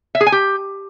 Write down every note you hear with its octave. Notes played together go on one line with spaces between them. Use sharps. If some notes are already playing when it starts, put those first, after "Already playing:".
E5
G#4
G#5
G4